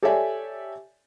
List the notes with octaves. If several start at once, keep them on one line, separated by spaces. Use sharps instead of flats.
G4 A4 C#5 D5 E5 G#5